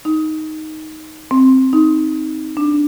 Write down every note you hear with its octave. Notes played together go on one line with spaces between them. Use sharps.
D#4
C4
D#4
D4